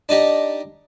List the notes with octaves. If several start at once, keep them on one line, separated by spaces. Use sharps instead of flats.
D4 D#4 G4